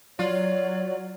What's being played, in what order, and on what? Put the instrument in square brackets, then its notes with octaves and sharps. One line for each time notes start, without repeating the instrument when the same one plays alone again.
[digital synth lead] F#3 [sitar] F4 [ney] C#5 [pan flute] D5